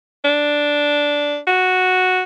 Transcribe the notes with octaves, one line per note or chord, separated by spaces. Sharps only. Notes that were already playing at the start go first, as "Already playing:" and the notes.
D4
F#4